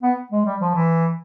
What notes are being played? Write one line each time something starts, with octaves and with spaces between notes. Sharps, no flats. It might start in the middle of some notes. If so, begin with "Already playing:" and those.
B3
G#3
G3
F3
E3